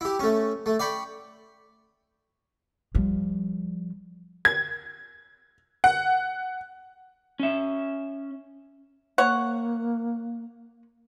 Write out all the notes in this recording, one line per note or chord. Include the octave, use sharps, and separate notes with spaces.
E4 G4
A3 C#4
A3
D5 G5 B5 C#6
F3 G3
G#6
F#5
C#4 E5
A#3 C#5 F#5